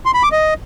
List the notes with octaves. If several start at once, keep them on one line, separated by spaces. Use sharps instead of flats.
C6
B5
D6
D#5